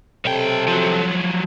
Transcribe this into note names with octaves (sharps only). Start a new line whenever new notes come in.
B1 C3 A4 G5
F3 F#3